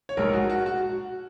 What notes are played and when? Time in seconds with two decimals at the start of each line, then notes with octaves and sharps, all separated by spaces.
0.09 C#5
0.17 A#1 G#2 G#3 A#4
0.33 F#4
0.50 F#4
0.66 F#4